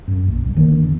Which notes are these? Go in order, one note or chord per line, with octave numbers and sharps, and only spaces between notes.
F#2
A#1
C2
D3 D#3 F3 A#3
E2